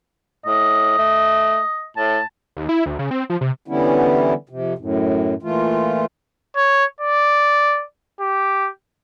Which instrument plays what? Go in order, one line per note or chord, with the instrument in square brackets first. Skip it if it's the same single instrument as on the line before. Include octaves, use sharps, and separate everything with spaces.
[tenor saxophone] A2 [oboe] D#5
[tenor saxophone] A3
[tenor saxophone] A2 [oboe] A5
[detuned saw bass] D#2
E4
D2
C#3
C4
F3
C3
[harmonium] D3 E3 G3 B3 C#4 E4
F2 C3
F#2 A2
A#2 E3 A3 F4
[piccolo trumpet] C#5
D5
G4